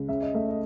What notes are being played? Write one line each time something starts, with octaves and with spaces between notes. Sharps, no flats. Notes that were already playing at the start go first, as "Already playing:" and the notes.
Already playing: C#2
C#3 E5
D#5
A3 E5
D#5